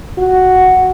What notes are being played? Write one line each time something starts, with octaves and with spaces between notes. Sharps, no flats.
F#4